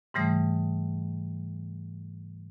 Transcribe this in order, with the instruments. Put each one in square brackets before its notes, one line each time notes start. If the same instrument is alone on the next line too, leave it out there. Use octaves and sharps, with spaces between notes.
[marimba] G#2 C#3 E3 G3 A3 D#6